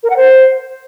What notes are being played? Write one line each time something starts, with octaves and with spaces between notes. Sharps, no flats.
A#4
F#5
C5